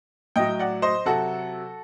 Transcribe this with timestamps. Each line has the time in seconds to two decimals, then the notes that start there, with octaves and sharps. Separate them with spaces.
0.36 A2 F#3 D#5 G5
0.59 D5 F#5
0.82 C5 D#5
1.05 C3 F#3 F#4 A4